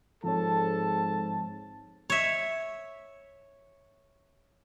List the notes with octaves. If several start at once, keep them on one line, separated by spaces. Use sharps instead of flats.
G#2 F3 C4 A4 C#5 A5
C#5 E5